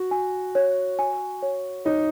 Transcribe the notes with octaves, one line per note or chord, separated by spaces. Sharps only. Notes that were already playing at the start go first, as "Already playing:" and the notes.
Already playing: F#4
G#5
C#5
G#5
C#5
D#4 C#5